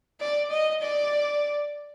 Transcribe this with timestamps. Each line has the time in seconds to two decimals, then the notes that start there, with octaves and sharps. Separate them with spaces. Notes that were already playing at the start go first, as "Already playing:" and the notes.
0.21 D5
0.51 D#5
0.82 D5